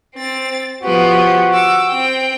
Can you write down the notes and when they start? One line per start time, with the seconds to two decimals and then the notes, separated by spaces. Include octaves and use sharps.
0.17 C4 A6
0.83 F3 B3 F#4 G4
1.54 D6 E6
1.88 C4 G5